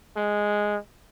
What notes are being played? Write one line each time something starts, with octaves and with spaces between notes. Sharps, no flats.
G#3